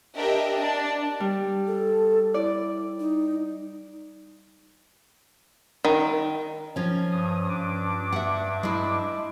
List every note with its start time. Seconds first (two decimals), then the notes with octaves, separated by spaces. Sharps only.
0.16 D4 G4 A#4 D#5 E5
0.55 D4 A5
1.20 G3
1.67 A4
2.34 E4 D5
3.00 D#4
5.85 D#3
6.76 F3 C#4 G#6
7.11 G2 D#6
7.49 G2 D4 D6
8.13 E5 F#5
8.63 G#3 E4